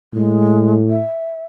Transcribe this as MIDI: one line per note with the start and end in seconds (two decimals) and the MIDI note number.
0.14 1.01 45
0.14 0.75 56
0.90 1.46 76